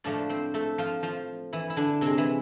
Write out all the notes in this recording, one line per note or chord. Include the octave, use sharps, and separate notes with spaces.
A2 F3 A3 D4 D5
C4 C5
A3 A4
F3 F4
F3 F4
E3 E4
E4
D3 D4
C3 G#3 C4
E3 E4